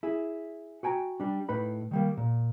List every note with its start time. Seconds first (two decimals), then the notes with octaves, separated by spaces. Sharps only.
0.03 E4 G#4
0.83 F#4 G5 G#5 A#5
1.20 G3 D4
1.49 A2 D#4 B4 B5
1.91 D#3 G3 A#3
2.17 A#2